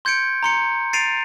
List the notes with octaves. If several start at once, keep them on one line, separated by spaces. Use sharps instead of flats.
C6 G6 G#6 C#7 D7
A#5 C6 C#7
A6 C7 D7 D#7 F7